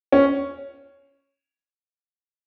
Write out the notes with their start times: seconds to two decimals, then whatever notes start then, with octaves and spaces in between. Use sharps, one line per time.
0.12 C#4